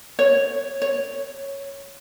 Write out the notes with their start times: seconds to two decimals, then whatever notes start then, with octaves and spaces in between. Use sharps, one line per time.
0.19 C#5
0.82 C#5